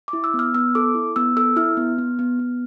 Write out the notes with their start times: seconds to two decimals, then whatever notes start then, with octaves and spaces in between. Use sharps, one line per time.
0.08 D6
0.13 E4
0.24 E6
0.34 B3
0.39 F6
0.54 B3 E6
0.75 A4 D6
0.95 E4
1.16 B3 E6
1.37 A4 E6
1.56 E4 F6
1.77 B3
1.98 B3
2.19 B3
2.39 B3